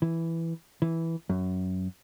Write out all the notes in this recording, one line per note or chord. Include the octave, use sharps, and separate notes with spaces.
E3
E3
F#2